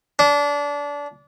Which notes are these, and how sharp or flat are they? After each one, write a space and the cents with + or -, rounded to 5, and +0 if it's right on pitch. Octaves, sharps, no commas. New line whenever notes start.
D4 -25